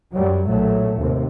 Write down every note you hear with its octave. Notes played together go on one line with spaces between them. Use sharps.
F#2 F#3 G3
B1 A#2 F#3 A3
D#2 A2 C3